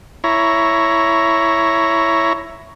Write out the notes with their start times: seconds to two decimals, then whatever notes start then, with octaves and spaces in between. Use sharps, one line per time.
0.24 E4 C#5 A#5